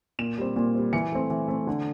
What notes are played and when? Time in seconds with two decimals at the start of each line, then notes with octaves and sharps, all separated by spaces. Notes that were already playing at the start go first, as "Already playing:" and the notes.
0.19 A#2 E7
0.38 G3 C4
0.56 A#2
0.75 G3 C4
0.93 E3 C#7
1.12 A3 C4
1.30 E3
1.48 A3 C4
1.67 D3